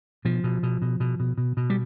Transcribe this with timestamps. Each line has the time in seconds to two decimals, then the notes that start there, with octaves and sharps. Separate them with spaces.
0.25 B2 F3
0.44 B2
0.63 B2
0.82 B2
1.00 B2
1.20 B2
1.38 B2
1.57 B2
1.70 G3